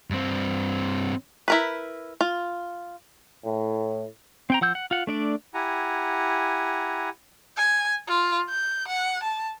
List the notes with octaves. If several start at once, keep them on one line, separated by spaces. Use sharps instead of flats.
G2 C4
E4 A#4 B4
F4
A2
C4 G5 A#5
F3 F#5 E6 G6
F#5
F4 F#5
A3 D4 D5
E4 G4 F#5 G#5 A#5
G#5
F4
G6
F#5
A5